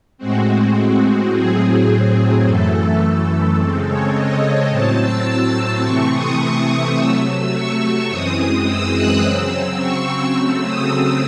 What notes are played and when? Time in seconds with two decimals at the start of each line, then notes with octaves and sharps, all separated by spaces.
0.18 A2 G#3 C4 F#4
1.31 A2 F#3 C4 G#4
1.87 G#4
2.43 F#2 E3 A3 A4
3.01 A4
3.57 C#3 G#3 C4 A4
3.85 C#5
4.14 D#5
4.70 A2 F#3 C4 A5
4.98 E6
5.26 E6
5.82 C3 E3 A3 C4 C#6
6.11 D#6
6.95 C3 F#3 A3 E6
7.52 C#6
8.09 F#2 E3 G#3 C4 D#6
8.65 E6
8.93 F#6
9.21 C#3 F#3 C4 E6
9.78 C#6
10.35 C#3 F#3 A3 C4 E6
10.63 D#6
10.91 D#6